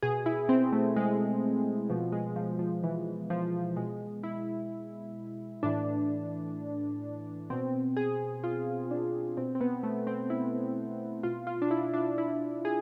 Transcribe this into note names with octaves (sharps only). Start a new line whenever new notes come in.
B2 G#4
E4
C4
A3
G#3
B2 F3
G#3
F3
F3
E3
F3
B2 G#3
E4
A2 E3 D4
B2 C4
G#4
F4
D4
B2 C4
C4
B3
A3
C4
E4
B2 F4
F4
D4
E4
D4
E4
G#4